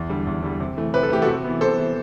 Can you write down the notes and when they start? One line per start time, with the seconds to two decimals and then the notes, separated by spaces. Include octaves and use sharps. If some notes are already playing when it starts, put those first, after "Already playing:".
Already playing: E2
0.09 D3 G3
0.27 E2
0.43 D3 G3
0.60 C3
0.77 E3 A3
0.94 C3 B4
1.03 A4
1.10 E3 A3 G4
1.22 C3 F#4 A4
1.44 E3 B3
1.60 C3 A4 C5
1.77 E3 B3